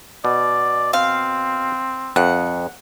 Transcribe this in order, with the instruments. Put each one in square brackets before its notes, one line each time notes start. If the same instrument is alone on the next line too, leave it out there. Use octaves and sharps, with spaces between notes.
[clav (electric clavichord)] B2 [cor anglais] D5
[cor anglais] C4 [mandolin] F5
[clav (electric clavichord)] F2 [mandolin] F#5